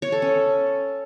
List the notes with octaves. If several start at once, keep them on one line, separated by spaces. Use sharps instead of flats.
C#5
A4
C#4